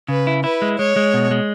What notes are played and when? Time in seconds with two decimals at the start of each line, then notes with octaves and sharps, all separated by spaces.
0.08 C#3 B4
0.27 E4
0.44 E4 B4
0.62 G#3
0.79 G#3 C#5
0.96 G#3
1.14 B2
1.31 G#3